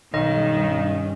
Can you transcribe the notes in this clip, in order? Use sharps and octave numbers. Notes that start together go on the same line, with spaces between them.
B1 G2 D#3 G3 C#4 D#5